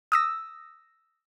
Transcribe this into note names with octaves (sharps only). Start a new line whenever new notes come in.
D#6 E6 A#6